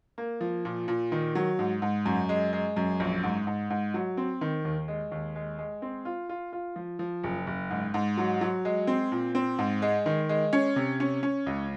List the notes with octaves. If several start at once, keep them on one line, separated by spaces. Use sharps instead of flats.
A#3
F3
A#2
A#2
D#3
F#3
G#2
G#2
F#2
G#3
G#3
F#2
A#1
G#2
G#2
G#2
F#3
C4
D#3
D#2
G#3
D#2
G#3
G#3
C4
F4
F4
F4
F3
F3
F#1
F#1
G#2
G#2
F#3
F#3
G#3
C4
A#2
C4
G#2
G#3
D#3
G#3
C#4
C3
C#4
C#4
C#2